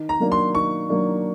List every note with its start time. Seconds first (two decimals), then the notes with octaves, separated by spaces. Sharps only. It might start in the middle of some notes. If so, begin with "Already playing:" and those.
Already playing: D#3
0.09 A#5
0.20 F#3 A#3 D4
0.32 C6
0.55 D#3 C#6
0.89 F#3 A#3 D4